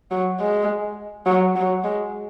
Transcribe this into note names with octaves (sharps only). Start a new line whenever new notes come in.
F#3
G#3
F#3
F#3
G#3